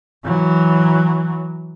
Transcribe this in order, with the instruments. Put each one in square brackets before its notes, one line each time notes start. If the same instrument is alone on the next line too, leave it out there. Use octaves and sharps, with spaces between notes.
[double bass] E3 F#3